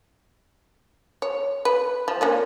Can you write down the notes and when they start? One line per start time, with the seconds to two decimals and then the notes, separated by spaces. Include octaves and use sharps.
1.22 C#5
1.65 B4
2.08 F3
2.21 A#3 C#4 D4